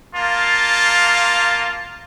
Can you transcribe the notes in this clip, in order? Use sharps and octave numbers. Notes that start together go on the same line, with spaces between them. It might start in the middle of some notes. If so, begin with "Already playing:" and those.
A#3 F4 F5 A5